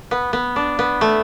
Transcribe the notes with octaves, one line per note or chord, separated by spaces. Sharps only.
B3
B3
D4
B3
A3